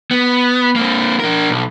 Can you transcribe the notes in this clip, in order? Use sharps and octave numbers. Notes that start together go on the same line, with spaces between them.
B3
A#3 C4
D4 A#4
B1